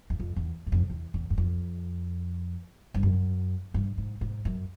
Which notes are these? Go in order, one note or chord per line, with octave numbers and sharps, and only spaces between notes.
E2
F2
E2
F#2
F2
E2
E2
F#2
F2
G2
F#2
G2
G#2
G#2
F#2